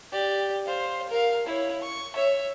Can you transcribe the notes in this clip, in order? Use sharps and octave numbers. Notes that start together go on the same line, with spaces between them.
G4 D5
C5 F5
A#4 F5
E4 C#5
C#6
C#5 E5